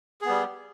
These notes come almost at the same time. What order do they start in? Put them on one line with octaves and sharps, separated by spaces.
G#4 B3 G3